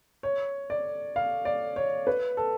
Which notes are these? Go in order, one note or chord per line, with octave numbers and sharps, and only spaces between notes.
C#5
D5
F5
D5
C#5
B4
A4